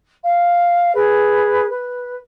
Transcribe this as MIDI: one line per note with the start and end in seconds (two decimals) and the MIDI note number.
0.24 0.93 77
0.94 1.66 68
0.94 1.66 71
1.70 2.15 71